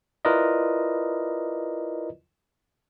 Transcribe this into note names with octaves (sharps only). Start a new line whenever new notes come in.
E4 F4 A#4 B4 D5 D#5